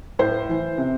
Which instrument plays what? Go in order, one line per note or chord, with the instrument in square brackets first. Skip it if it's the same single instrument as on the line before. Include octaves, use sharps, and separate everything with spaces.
[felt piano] A2 C5
E3
C3